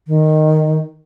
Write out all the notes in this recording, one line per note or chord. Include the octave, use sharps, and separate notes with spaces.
D#3